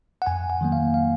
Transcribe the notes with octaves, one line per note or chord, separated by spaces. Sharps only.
F#5
F2 G#5
F#5
D#3 F#3 A#3
F5
F5